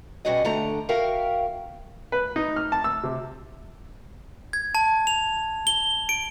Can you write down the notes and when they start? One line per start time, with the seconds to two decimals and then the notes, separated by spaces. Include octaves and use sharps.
0.25 B2 G3 C#4 F#4 G#4 D#5
0.45 D3 A3 A#5
0.89 F#4 A#4 E5 F5 G5
2.12 B4
2.36 D#4
2.56 F6
2.72 A5
2.84 E6
3.03 C3
4.53 G#6
4.75 A5
5.07 F7
5.67 G7
6.09 D7